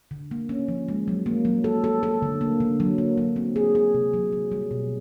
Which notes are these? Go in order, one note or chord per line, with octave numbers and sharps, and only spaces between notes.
D3
A#3
C#4
F3
G#3
F#3
A#3
F#3
A4
A4
A4
D3
A#3
D3
F#3
A#3
F#3
C4
G#4
G#4
C3
F#3
F#3
G3
B2